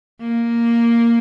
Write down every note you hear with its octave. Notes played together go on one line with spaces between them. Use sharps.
A#3